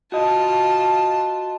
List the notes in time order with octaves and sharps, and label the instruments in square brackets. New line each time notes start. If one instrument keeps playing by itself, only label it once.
[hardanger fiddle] F4 A5 [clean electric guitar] F#4 D#5